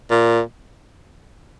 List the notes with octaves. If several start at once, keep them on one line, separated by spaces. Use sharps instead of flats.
A#2